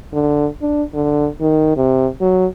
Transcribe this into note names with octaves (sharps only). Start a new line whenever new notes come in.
D3
D4
D3
D#3
C3
F#3